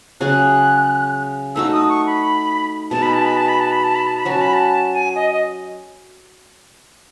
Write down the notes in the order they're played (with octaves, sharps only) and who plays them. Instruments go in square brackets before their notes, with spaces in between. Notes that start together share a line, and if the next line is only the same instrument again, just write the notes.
[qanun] C#3 F#3 C#4 G#4 [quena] F#6
[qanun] A3 D#4 F#4 [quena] E6
[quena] D#6
C#6
B5
[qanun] B2 G#3 D#4 [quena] A5
[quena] B5
A5
B5
A5
B5
A5
B5
A5
B5
A5
B5
[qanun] F#3 C#4 F#4 [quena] A5
[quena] B5
A5
G#5
D#5
D#5